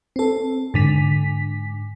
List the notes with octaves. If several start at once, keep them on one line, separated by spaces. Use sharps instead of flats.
C4 A4
G#2 D3 B6